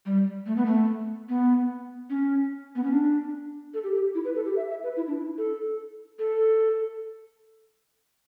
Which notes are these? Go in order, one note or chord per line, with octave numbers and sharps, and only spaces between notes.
G3
A3
B3
A3
B3
C#4
B3
C#4
D4
A4
G4
G4
E4
B4
A4
G4
E5
E5
B4
E4
D4
E4
A4
A4